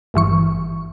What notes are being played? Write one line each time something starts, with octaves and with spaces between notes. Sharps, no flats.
G#1 G2 E3 C#6